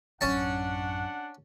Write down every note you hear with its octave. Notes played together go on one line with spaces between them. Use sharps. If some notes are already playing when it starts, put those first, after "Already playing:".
A1 F#2 C#4 D4 F#5 A5